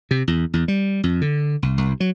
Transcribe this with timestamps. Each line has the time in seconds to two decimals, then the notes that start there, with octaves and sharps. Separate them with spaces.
0.11 C3
0.28 E2
0.53 E2
0.68 G3
1.04 F2
1.22 D3
1.62 C2
1.78 C2
2.00 F#3